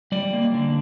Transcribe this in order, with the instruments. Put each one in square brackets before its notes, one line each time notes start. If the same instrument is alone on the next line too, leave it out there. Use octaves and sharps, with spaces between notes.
[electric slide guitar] G3 D5
A#3
D3